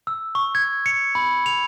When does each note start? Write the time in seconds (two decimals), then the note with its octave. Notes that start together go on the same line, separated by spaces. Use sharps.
0.07 E6
0.35 C#6
0.55 G#6
0.86 C#7
1.15 B5
1.46 F7